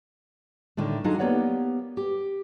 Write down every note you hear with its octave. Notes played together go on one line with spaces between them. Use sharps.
A2 D3 D#3 A3
F#3 D4 D#4 F4 G#4 A4
A#3 B3 G4 C#5 D5 F#5
G4